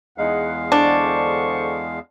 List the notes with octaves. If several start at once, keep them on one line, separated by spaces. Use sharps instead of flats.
E2 G#3 D#4 G#4 F5 F#5
D3 D4 C5 C#6